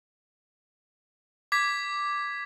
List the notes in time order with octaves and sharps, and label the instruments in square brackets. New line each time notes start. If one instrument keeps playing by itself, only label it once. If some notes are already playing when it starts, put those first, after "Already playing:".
[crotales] D6 G#6 B6